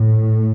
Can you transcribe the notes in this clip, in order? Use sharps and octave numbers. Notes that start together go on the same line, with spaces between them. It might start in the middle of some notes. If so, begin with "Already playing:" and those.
Already playing: A2